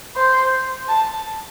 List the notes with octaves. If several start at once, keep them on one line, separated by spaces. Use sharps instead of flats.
C5
A5